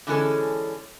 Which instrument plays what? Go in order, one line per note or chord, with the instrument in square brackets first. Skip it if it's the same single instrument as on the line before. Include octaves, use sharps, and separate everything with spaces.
[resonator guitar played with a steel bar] D3 E3 G#3 C#4 A4